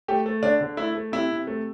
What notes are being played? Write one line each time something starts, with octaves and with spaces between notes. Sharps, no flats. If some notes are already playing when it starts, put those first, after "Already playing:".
A3 G4
A3
D3 D4
D3
A3 E4
A3
C3 E4
C3
A3